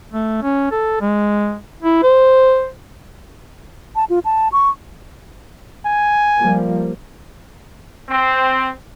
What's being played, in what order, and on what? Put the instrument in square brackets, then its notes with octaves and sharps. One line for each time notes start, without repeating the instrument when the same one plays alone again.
[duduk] A3
C#4
A4
G#3
E4
C5
[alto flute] A5
F4
A5
C#6
[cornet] G#5
[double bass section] F3 G3 A#3
[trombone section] C4